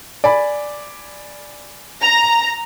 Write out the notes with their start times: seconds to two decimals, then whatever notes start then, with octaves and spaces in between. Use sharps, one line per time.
0.24 D5 G#5 B5
2.02 A#5